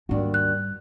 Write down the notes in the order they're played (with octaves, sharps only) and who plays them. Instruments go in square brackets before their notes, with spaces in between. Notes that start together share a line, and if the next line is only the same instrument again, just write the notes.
[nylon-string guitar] D#2 D4 F#4 [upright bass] G#2 G3
[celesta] F#6